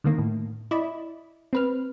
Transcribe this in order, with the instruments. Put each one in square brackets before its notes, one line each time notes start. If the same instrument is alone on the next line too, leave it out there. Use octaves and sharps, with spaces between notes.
[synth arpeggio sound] D3 D#3 A#3
A2
E4 D5 D#5 B5
C4 B4 F6